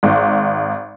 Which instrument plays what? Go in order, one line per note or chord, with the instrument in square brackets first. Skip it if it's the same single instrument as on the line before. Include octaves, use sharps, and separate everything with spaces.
[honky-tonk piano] G#1